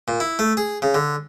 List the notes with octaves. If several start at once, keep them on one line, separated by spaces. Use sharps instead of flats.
A#2
E4
A3
G#4
C#3
D3